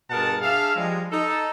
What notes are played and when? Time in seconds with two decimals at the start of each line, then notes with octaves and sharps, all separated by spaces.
0.10 G2 B2 G#4 A#4 F#5 A5
0.42 D4 G#4 E5 F5
0.76 F3 G3 G#3
1.11 D#4 A4